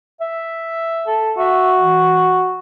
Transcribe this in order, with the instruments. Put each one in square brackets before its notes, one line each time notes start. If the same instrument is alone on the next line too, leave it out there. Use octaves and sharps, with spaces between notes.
[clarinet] E5
[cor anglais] A4
[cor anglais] F#4 [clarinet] E5
[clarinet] E3